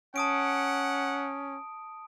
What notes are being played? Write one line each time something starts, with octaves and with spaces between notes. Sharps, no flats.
C#4 F#5 A5 D#6 D7